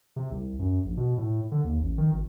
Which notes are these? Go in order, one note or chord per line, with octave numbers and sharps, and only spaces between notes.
C3
C2
F#2
A#1
B2
A2
D3
D#2
A1
D#3
G#1